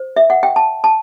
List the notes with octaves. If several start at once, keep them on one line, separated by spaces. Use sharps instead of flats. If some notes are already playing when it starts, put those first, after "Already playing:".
Already playing: C5
E5
F#5
G5
A5
A5